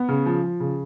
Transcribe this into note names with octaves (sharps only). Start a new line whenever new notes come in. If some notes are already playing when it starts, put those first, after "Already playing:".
Already playing: B3
C#3
F3
F3
C#3